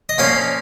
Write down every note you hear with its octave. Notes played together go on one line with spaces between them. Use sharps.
D#5
A#2 F3 A#3 C#4 F5